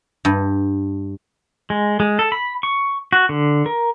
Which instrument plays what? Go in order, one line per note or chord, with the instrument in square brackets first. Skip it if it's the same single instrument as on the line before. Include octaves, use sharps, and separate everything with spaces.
[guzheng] G2
[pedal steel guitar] G#3
G#3
A4
B5
C#6
F#4
D3
A#4